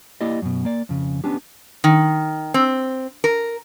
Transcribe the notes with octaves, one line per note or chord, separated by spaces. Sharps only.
A#3 E4 G4 D5 D#5
F#2 B2
A#3 D5
F2 C#3
B3 C#4 D4 G4
D#3
C4
A#4